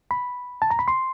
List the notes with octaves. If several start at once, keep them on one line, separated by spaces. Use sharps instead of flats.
B5
A5
A#5
B5
C6